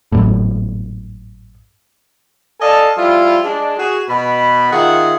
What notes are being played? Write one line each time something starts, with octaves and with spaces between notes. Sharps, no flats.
G#1 F#2 A2
A4 D5 D#5 F5 G#5 A5
F3 G3 E4 F4
G#3 D4
F#4 G#4
B2 B5
D#3 F4 G#4 E5 F#5